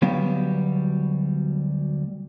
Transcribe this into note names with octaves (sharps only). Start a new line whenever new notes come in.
D2 F#3 G3 B3 F5